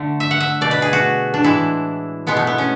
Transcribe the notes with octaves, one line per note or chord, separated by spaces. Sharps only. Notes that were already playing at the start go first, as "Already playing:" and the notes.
Already playing: D3 A3
E5
F#5
E5
B2 A3 D5
B4
G#4
F#4
D4
A2 E3 G#3 E4
B2 G#3 B3
A3
B3
C#4